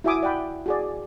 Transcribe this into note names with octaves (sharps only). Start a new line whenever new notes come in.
E4 F#4 E5 G#5 D6 D#6
D5 F#5 G5 B5
F#4 G#4 D5